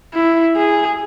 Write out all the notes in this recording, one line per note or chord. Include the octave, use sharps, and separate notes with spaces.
E4
G#4